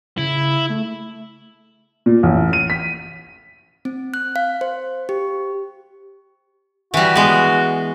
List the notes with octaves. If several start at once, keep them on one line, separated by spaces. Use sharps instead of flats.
C#3 E4
A3
A#2
A1
D#7
B6
C4
F#6
F5
C5
G4
E3 G3 F#4
G#3 B3